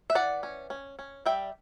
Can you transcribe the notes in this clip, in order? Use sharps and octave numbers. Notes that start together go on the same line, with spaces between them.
E5
E3 D5 F#5
C#4
C#4
C#4
G3 E5 G5